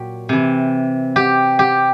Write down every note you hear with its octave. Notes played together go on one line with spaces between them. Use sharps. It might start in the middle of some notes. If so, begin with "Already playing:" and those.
Already playing: A#2 F#3 G4
C3 E3
G4
G4